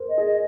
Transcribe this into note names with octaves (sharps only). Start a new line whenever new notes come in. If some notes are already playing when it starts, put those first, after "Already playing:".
Already playing: A#4 C5
D#5
G#4
D#5